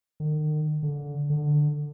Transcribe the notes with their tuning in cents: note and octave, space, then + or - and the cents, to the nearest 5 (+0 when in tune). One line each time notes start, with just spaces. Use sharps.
D#3 -40
D3 -20
D3 +15